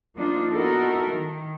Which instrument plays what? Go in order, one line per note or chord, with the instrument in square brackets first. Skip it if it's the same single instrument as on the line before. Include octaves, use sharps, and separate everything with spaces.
[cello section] F3 A#3 D4 D#4 F4
B3 D#4 E4 F#4 A4 A#4
D#3